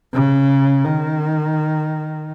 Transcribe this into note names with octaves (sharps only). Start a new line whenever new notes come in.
C#3
D#3